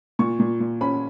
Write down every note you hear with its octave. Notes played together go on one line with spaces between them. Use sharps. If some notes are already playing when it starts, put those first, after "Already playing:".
A#2 C#6
A#2
A#2
C#4 B5